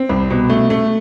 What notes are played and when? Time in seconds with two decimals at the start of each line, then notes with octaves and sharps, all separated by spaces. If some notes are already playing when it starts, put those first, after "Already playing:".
Already playing: C4
0.09 C2
0.30 B2
0.50 A3
0.70 A3